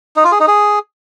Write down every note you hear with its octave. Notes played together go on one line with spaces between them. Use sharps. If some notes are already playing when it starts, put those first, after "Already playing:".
D#4
F4
G#4
D#4
G#4